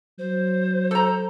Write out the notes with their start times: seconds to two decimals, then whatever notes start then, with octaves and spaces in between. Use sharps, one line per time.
0.19 F#3 C5
0.91 A4 A#5